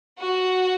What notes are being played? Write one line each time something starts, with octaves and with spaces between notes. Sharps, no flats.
F#4